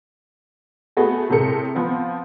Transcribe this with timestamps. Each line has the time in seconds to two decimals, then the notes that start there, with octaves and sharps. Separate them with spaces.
0.97 A3 B3 F#4 G#4
1.30 A2 C3 G#3 A4 A#4 C#7
1.75 F3 B3 C4